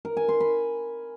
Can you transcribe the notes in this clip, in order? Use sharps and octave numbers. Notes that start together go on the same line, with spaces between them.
A#4
G#5
C6
B5